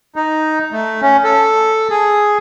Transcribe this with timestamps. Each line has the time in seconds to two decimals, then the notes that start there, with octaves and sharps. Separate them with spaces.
0.16 D#4
0.72 A3
1.02 C#4
1.24 A4
1.90 G#4